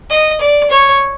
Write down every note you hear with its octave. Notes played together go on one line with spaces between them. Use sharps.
D#5
D5
C#5